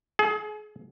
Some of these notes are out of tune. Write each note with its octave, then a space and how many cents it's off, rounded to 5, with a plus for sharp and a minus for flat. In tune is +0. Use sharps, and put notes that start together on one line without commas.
G#4 +35